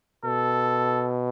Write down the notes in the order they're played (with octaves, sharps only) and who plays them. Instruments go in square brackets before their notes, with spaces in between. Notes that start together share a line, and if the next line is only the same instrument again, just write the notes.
[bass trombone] B2 [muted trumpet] A4